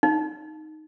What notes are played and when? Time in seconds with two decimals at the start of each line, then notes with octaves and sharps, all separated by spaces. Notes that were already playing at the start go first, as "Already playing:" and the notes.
0.03 D#4